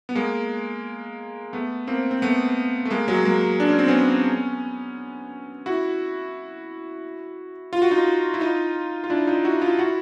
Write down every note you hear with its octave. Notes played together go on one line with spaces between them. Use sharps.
B3
G#3 A#3
A3 B3
A#3 C4
C4
A3 B3
A3
G#3 A#3
F#3 G#3
G#3 A#3
D4
C#4
C4
B3 C#4
E4 F#4
F4
F#4
D#4 F4
E4
D#4 F4
F4
D4 E4
D#4 F4
E4 F#4
D#4 F4
E4 F#4